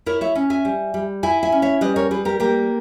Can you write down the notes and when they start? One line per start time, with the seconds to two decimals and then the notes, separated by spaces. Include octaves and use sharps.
0.06 E4 A#4 C#5
0.21 C#5 E5
0.35 C#4
0.50 E5 G#5
0.65 G3
0.94 G3
1.23 E4 E5 G#5
1.43 E5 G#5
1.52 C#4
1.62 C#5 E5
1.81 G3 B4 D#5
1.96 A#4 C#5
2.11 G3 G#4 B4
2.25 G4 A#4
2.40 A#3 G4 A#4